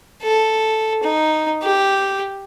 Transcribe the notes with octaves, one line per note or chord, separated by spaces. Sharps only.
A4
D#4
G4